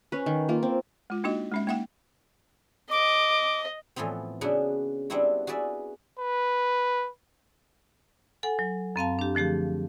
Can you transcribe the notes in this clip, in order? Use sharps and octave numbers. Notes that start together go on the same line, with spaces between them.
C#4 B4
D#3
A#3 F4
C4
G#3 F4
A#3 D4 D#4 F#4 D#5
G#3 C#4 E5
A#3 D#4 E5 F#5 G5
D#5 D6
A2 E3 F3 B3 C4
C#3 B3 D4 E4 F#4
G3 B3 C4 D4 E4 F#4
F#4 G#4 B4 D5 E5
B4
A4 F#5 G#5
F#3
F#2 C4 F5 A5
D4 G4
D3 F3 A3 G4 G#4